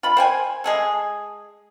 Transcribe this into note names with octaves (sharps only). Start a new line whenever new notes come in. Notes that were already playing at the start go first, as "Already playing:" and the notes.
F4 B5
C5 G5 G#5
G#3 G#4 A4